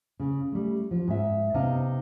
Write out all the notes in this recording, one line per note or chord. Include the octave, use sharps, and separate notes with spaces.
C#3
G3 A3
F3
G#2 E5
C3 B3 D#4 D#5 F5 A5